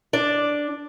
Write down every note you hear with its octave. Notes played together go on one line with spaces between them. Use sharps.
D4 D5